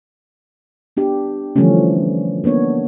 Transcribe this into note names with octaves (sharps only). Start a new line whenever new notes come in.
B3 D4 G4
D3 E3 F3 G3 A3 C#4
A#3 B3 D4 C#5